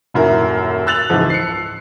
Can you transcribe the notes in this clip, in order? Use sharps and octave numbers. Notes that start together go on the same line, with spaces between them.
D#1 F#2 E4 A#4
E6 F#6 A6 F7 F#7
C#2 G#2 E3 F3
C7 C#7